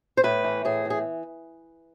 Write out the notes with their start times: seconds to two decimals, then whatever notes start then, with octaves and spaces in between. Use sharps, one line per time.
0.17 C5
0.23 A2 B4
0.44 E3
0.65 A2 G#4
0.85 E3
0.90 G#4